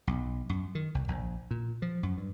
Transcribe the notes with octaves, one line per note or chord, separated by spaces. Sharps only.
B1
F#2
D#3
C2
A#1
A#2
F3
F#2
G2